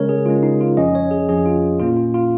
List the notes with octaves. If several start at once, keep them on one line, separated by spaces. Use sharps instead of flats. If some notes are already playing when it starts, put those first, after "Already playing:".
Already playing: C#3 G#3 C#4 A#4 C#5
G#4
C#3 G#3 C#4 F4
D#4
F4
F2 F3 C#4 D#5
C#5
G#4
F2 F3 C#4 G#4
F4
A#2 A#3 C#4 F4
F4
F4